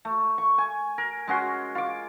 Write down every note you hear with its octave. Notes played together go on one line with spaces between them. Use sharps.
A3
C#6
G#5
A#4
G#3 C#4 F#4 C6
F4 D6